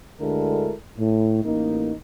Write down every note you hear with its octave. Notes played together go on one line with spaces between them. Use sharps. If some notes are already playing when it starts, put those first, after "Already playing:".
D2 D3 G#3 E4 A4 A#4
A2
A1 A#3 D#4